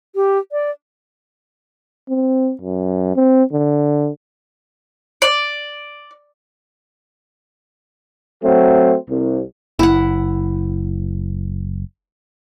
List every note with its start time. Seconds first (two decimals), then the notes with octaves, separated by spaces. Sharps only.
0.15 G4
0.52 D5
2.09 C4
2.61 F#2
3.16 C4
3.53 D3
5.22 D5
8.43 F#3 A3 C4
9.09 C2
9.79 F#1 E4 F#5